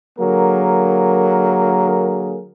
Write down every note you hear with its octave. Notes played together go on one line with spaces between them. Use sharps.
D3 F#3 A#3 G#4 A#4